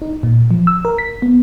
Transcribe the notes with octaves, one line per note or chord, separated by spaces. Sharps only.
D#4
A#2
F3
E6
A#4
B6
B3